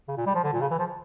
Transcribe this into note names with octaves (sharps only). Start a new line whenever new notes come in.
C#3
A#2
G3
F3
D3
A#2
C#3
E3
F3